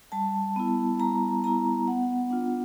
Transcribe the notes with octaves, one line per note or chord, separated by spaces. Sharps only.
G3 A5
B3 E4
G3 A#5
B3 E4 A#5
B3 F#5
D4 F4